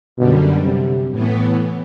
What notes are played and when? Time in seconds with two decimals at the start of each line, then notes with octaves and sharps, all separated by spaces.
0.18 F#2 B2 D3 G3
0.65 C3
1.11 A2 E3 B3